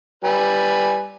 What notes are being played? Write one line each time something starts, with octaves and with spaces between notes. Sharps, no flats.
G3 B4 G#5